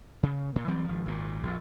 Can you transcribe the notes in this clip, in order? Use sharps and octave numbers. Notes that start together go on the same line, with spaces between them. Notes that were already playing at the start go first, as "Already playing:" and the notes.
C#3
A#2
E3 F#3 G3 C4
G#1 F3
G#1 A#2
A#1 F2